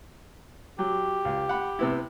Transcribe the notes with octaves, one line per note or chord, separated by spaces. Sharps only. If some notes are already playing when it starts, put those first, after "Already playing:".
F#3 G4
C#2
F#5 B5
C3 B3 E4